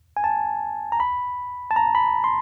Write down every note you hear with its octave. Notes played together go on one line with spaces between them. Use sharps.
G#5
A5
A#5
B5
A5
A#5
B5
C6